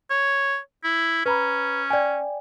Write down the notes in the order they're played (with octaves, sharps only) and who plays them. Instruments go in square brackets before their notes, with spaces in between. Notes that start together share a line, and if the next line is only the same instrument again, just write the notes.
[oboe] C#5
E4
[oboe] C#4 [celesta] B4 A#5 B5
[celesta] D5 G5 G#5